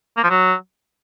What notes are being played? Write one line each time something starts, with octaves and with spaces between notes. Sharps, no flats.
A#3
F3
F#3